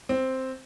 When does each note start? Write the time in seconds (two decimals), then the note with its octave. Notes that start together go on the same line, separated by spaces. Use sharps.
0.09 C4